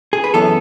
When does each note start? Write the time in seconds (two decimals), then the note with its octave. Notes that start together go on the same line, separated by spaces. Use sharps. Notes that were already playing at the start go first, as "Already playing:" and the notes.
0.13 G#4
0.24 B4
0.34 F#2 E3 B3 A4